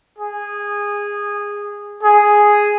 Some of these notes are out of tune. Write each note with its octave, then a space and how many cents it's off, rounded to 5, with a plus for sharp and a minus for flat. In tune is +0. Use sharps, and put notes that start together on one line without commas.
G#4 -15
G#4 +0